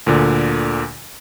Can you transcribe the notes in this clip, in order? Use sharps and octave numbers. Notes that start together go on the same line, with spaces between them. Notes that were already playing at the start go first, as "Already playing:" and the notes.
D2 A#2 D3